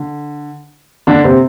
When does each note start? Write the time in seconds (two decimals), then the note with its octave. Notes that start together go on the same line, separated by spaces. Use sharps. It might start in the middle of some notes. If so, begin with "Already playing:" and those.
Already playing: D3
1.07 D3 D4
1.24 C3 C4